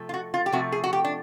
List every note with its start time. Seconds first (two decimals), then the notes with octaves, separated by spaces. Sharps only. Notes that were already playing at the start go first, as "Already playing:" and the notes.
Already playing: C3 F3 A3
0.09 F4
0.14 F#4
0.34 F4
0.46 G4
0.52 C3 F3 A3 F#4
0.72 G#4
0.84 F#4
0.93 G4
1.05 D4